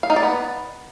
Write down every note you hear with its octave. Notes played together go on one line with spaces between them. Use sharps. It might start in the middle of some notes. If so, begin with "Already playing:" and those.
F5
D#4
D5
B3